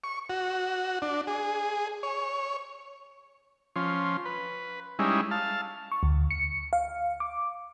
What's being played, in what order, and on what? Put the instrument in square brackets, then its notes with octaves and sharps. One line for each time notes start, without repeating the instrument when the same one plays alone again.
[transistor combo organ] C#6
F#4
D4
G#4
C#5
F3 C#4 C6
B4
G3 G#3 C#4 D#4 E4
F5 A5
[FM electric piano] C#6
D2
C#7
F5
D6